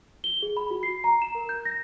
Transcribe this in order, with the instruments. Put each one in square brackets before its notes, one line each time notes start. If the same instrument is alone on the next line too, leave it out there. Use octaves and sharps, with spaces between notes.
[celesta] G7
G#4
B5
F#4
C7
A#5
E7
A#4
G6
A#6